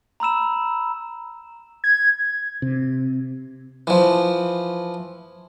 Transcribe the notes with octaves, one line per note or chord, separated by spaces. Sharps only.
A#5 B5 E6 E7
G#6
C3
E3 F3